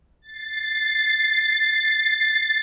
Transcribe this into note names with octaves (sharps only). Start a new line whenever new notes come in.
A6 C7